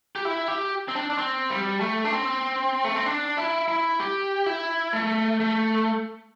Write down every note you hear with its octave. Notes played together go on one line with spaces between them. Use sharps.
G4
E4
G4
C4
D4
D4
C4
G3
A3
D4
C4
A3
C4
D4
E4
E4
G4
E4
A3
A3